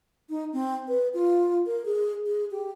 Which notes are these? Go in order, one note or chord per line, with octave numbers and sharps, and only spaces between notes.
D#4
C4
B4
F4
A#4
G#4
G#4
G4